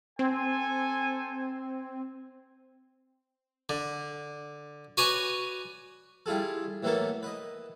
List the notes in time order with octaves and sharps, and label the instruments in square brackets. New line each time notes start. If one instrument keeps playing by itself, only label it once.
[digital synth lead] C4 [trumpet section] A4 C5 G#5
[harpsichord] D3
F#4 B4 C#5 D5 G#5
G3 E4 F4 G#4 A4
A2 E3 F#3 A#3 B3 A4
B4 D#5